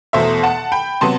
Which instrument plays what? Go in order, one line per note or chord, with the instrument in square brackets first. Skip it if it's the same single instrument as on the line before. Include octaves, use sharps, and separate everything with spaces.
[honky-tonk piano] E2 B2 A3 C5 E5
F#5 A5
G5 B5
C3 F#3 B3 A5 C6